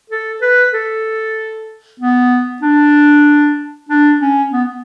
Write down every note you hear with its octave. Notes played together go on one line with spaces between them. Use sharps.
A4
B4
A4
B3
D4
D4
C#4
B3